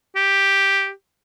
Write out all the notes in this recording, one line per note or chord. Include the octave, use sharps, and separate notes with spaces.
G4